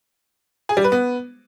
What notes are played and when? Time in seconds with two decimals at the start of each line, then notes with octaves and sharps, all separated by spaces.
0.69 G#4
0.77 G3
0.84 B4
0.92 B3